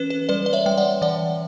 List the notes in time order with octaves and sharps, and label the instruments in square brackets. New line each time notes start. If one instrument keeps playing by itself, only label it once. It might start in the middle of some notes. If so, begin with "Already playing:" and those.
Already playing: [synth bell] E3 C#4 B4
B4
G3 B4 D5
D5
C#5 E5
G3 G5
D5 F#5
E3 D5 F#5